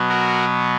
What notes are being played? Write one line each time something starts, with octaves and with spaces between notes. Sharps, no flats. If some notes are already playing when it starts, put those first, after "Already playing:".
Already playing: B2 F#3 B3
F#4 A#4